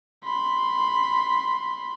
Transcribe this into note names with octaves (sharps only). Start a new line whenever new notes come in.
B5 C6